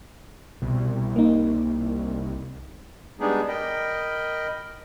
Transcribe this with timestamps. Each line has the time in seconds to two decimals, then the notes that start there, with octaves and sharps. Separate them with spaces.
0.62 C2 B2
1.16 A#3 D#4
3.20 G3 G#3 B3 D4 D#4 G#4
3.48 A#4 D#5 G5 B5